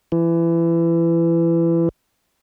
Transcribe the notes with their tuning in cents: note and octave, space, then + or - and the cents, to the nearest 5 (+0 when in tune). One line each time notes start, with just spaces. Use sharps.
E3 +25